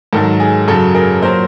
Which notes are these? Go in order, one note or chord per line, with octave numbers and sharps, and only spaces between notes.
G#2 D#3 F#3 A4
G#4
F#2 C#3 F#3 A4
G#4 A#4
A#2 F#3 A#4 C5